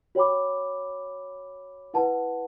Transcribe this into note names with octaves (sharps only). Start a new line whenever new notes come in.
F#4 C#5 G5 B5 D6
E4 B4 F#5 A5